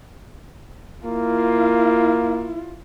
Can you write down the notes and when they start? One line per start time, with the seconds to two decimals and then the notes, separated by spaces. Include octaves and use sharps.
1.04 A#3 E4 F4